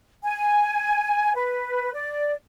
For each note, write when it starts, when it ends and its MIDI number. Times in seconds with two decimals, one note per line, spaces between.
0.24 1.33 80
1.35 1.91 71
1.94 2.34 74